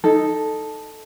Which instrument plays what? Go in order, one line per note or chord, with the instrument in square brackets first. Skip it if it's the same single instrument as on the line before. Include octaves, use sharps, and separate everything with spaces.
[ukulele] D#4 A4